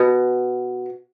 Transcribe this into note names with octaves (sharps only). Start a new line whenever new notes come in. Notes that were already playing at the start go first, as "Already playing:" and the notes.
Already playing: B2 B3